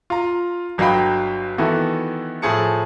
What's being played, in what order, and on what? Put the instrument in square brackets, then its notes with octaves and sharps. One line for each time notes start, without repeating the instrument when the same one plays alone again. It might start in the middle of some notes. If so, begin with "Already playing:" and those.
[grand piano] F4 A#5
G1 F#3 D#5 F5 G5 B5
D#3 E3 B3 E4 F#4 A4
A2 F3 A3 G#4 A5 C#7